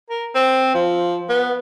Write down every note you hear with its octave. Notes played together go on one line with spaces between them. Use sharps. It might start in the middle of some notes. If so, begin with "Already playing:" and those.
A#4
C4
F3
B3